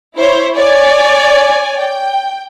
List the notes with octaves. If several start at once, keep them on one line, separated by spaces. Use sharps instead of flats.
E4 C5 C#5
C#5 D5 G#5
G5